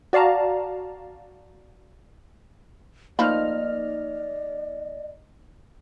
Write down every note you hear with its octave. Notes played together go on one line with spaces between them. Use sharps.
F#4 D5 F5 A5 A#5
F3 A3 A#3 D#4 D5 D#5 B5 F6